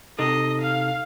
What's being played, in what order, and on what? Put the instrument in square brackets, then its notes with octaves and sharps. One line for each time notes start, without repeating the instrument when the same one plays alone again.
[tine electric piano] C3 D#4 A4 [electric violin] D#5
[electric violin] F5